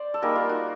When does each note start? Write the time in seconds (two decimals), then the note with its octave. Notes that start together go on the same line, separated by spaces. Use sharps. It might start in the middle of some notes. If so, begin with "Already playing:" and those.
Already playing: C5 D5
0.14 A4
0.22 G3 A#3 D#4 G#4 A#4
0.35 F4
0.49 F#4